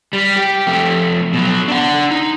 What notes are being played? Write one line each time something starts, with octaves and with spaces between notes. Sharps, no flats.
G3
G4
F2 A3
B2 F#3
D4 F#5
D#4